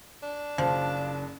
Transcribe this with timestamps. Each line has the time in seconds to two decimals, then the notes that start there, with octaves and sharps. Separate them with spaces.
0.23 D4
0.58 F#1 F3